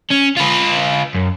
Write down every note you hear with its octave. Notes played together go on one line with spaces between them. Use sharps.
C#4
F4 B4
F#2